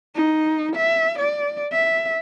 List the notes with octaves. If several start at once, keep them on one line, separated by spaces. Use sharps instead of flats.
D#4
E5
D5
E5